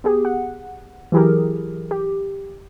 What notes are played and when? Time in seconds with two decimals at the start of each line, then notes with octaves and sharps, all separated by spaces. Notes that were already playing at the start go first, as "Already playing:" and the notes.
0.04 B3 G4 G#4
0.25 F#5
1.12 E3 F#3 E4 G4 G#4 A#4
1.91 G4